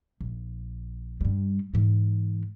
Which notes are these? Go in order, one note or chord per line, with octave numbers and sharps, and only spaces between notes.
A#1
G2 G3
G#2 E3